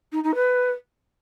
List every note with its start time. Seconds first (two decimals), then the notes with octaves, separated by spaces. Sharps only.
0.12 D#4
0.24 D#4
0.35 B4